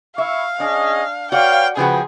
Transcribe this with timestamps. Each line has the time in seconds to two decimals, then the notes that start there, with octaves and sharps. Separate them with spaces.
0.18 E4 E5 F5 C#6
0.60 C#4 D4 G#4 D#5
1.32 F#4 B4 C#5 D5 F5 G5
1.77 C#3 F3 F#4 G#4 B4 G5